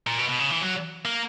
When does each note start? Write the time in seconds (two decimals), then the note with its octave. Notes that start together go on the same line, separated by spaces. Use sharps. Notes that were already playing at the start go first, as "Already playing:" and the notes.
0.07 A#2
0.19 B2
0.29 B2
0.39 C#3
0.51 E3
0.62 F#3
1.05 A#3